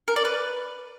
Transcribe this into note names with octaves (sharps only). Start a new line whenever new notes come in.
A#4
D5
B4